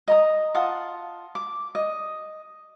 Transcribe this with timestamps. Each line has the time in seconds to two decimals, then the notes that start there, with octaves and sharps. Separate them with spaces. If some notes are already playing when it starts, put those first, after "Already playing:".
0.08 D#5 A#5 D#6
0.55 F4 F#5 A5 D#6
1.35 D6
1.75 D#5